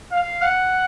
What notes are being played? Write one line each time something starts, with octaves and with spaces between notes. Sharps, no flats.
F5
F#5